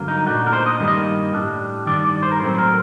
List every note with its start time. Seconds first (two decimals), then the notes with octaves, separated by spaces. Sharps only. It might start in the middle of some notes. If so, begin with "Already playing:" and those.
Already playing: G2 D3 F#3 A#3
0.08 D#4
0.26 A#2 A3 D4 F#4
0.40 D#4
0.47 A#4
0.53 C5
0.66 D#5
0.80 G2 D#3 G3 A#3
0.88 D#5
1.33 A2 G3 D4
1.86 G2 D#3 G3 D4 D5
2.05 D5
2.23 C5
2.32 A#4
2.40 A2 F#3 A3 C4 C5
2.55 C5
2.58 A#4